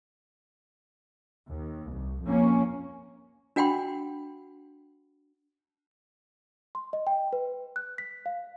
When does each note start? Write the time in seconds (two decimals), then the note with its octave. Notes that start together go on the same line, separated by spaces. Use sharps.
1.47 D#2
1.91 C2
2.24 F2 A#3 C#4
3.56 D4 F#4 F#5 G5 B5 C6
6.75 C6
6.93 D#5
7.07 G5
7.33 B4
7.76 F#6
7.98 B6
8.26 F5